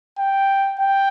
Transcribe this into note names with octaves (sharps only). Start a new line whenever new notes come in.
G5
G5